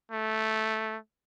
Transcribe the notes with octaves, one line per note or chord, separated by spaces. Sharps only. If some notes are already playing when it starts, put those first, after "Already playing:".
A3